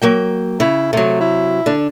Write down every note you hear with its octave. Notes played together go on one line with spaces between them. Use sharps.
F#3 A#3 G5
C#3 E4
C3 F#3 A3
E4
D3 D4